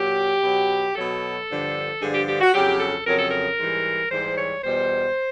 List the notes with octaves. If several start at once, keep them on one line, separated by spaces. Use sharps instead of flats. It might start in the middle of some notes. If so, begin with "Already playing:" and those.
Already playing: A#2 F#3 G4
B2 F#3
B2 F#3 A4
G2 D3 F3
G2 D3 F3 G#4
G4
G4
F#4
F2 C#3 F#3 G4
A4
F2 C#3 F#3 A#4
A4
A#4
G#2 E3 G3
G#2 E3 G3 C5
C#5
E2 B2 G3 C5